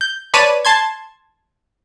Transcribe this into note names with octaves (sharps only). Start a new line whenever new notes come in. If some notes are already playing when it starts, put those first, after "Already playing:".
G6
B4 C#5 D5 A5 B5 D#7
A5 C6 G#6